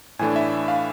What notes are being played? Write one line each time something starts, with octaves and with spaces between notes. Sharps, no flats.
A2 E3 A3 D4 G#5
E5
F5